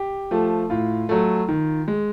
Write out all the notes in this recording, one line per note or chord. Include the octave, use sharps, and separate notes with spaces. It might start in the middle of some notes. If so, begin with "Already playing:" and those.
Already playing: G4
F3 A3
A2 F4
F#3 A3
D#3
G#3